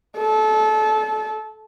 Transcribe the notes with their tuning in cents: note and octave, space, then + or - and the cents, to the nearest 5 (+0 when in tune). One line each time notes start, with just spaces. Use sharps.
A4 -25